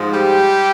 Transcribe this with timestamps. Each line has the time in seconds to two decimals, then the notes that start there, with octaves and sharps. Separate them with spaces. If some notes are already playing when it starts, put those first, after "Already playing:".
Already playing: G#2 F3 G#3
0.13 G3 G4